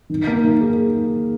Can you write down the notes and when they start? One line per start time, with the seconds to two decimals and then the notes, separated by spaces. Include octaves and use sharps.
0.10 D#3
0.27 A#3
0.44 D#3
0.61 G#4